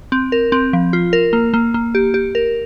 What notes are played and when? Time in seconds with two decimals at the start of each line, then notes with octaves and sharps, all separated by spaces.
0.12 C4
0.32 A#4
0.52 C4
0.73 F3
0.93 F4
1.13 A#4
1.33 A#3
1.54 A#3
1.74 A#3
1.95 G4
2.14 G4
2.35 A#4